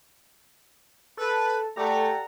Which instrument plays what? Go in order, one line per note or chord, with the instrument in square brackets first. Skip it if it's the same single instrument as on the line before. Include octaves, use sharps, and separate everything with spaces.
[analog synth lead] A4 [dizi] B4
[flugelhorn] A3 [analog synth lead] G4 [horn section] A4 F#5 A#5 [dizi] D5